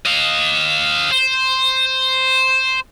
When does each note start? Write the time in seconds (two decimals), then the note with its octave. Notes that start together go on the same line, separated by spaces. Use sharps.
0.06 D#5 F5
1.11 C5